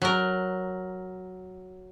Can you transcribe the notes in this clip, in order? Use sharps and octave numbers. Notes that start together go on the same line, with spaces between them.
F#3 A#4